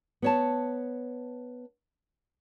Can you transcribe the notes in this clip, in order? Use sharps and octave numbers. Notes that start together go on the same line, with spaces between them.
B3 C#5 A5